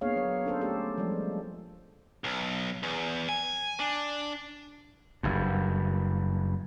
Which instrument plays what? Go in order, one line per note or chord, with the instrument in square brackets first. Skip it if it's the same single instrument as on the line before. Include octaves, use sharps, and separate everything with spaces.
[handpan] A#3 B3 D4 G#4 C#5 F5
F#3 C#5
C#4 D4 A4 C5
A3 G4 A4
F3 G3 G#3 D5
[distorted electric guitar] B1
E2
G#5
D4
[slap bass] F#1 G2